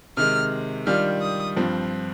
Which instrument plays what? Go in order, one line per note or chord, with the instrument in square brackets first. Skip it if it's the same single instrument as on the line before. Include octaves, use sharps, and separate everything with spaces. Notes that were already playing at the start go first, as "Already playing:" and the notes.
[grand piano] C3 D#3 G#3 [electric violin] F6
[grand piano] D#3 G3 D4 F4 [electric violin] F6
[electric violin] D#6
[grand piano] G2 F3 C4